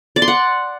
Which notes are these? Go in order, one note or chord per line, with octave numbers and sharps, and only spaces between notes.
D5
C6
F#5